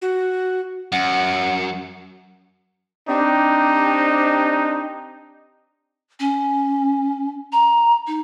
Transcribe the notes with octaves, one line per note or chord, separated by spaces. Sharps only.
F#4
F#2 F#5
C4 D4 D#4 G4
C#4
A#5
D#4